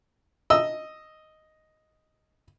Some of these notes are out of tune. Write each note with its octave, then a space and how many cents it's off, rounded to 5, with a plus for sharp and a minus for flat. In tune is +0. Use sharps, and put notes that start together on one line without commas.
D#5 +0 E6 +5